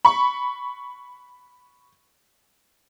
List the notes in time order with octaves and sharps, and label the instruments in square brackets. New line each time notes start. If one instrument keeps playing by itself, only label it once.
[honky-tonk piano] B5 C#6